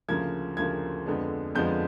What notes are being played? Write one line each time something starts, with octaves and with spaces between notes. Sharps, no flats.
D2 C#3 F3 A#3 G#6
D2 C#3 F3 A#3 G#6
F2 D3 F3 G#3 B3
F2 D3 F3 G#3 B3 G6